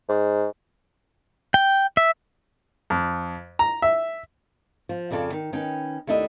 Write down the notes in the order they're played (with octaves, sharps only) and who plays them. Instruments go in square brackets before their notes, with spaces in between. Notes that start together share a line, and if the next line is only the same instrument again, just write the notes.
[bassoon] G#2
[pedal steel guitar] G5
E5
[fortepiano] F2
A#5
E5
[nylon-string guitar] F3
F2 C#3 D4 F4 A4 D5
D#3
D#3 C#4 B4 G5
D#2 A3 D4 E4 D#5